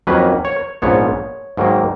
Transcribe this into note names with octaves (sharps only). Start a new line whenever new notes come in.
F2 D#3 F#3 A#3 C#4 B4
C#5
A#1 G#2 F3 B3 C#5
G#2 D#3 F#3 A#3